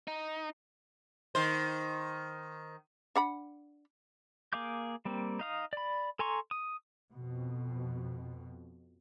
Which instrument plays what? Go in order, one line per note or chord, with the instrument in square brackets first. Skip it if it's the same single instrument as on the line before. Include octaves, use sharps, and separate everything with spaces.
[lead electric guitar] D#4
[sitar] D#3 C5
[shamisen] D4 F#5 B5
[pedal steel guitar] A#3 G#4 F5 D6 G6
G3 A#3 C4
D#4 F5 D#6
D5 B5
A4 G#5 A#5 C6 C#6
D#6
[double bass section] F2 B2